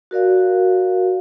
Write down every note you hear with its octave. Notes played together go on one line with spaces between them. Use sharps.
F#4 A#4 D5 F5